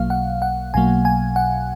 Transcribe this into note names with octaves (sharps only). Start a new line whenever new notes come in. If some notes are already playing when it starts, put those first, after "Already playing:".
Already playing: B1 B2 F#3 A#3 F5
F#5
F#5
B1 B2 F#3 A#3 G#5
G#5
F#5